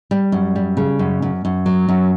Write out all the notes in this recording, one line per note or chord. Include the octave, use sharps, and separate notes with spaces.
G3
F#2
G3
C#3
F#2
F#2
F#2
F#3
F#2